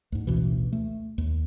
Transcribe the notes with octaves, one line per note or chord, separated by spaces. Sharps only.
D2 G#2
A1 D2 B2 E3
A3
D#2